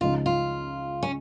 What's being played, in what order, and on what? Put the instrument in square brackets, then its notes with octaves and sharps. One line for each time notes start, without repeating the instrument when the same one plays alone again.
[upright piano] C#2 C#3 F3 G#3 D#4 [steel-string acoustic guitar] F4
[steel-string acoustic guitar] F4
C#4